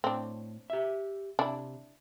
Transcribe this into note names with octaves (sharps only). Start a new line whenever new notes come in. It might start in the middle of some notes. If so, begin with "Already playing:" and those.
A2 C4 D4
G4 E5
C3 D4 E4